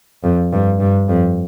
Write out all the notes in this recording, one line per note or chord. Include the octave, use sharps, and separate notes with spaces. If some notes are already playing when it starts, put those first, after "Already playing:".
F2
G2
G2
F2